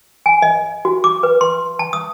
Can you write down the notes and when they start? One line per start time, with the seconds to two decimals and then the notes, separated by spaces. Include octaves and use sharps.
0.26 G#5
0.42 D#5
0.85 F#4
1.04 D6
1.23 B4
1.41 C6
1.79 A5
1.93 D#6